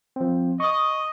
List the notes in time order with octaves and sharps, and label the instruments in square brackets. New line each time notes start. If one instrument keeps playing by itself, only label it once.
[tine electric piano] F3 C4
[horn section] D#5 [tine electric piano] C#6 D#6